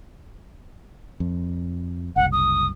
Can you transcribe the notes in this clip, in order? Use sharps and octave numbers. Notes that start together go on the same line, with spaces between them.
F2
F#1 C2 F#5
D#6